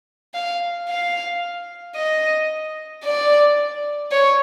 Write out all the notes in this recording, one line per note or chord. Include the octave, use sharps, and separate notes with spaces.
F5
F5
D#5
D5
C#5